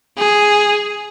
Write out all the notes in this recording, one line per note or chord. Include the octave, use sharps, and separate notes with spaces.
G#4